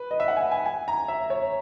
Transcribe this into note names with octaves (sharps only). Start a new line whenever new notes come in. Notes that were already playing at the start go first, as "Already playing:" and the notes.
Already playing: B4
D#5
E5
F#5
G#5
G#5
G#5
A#5
E5
C#5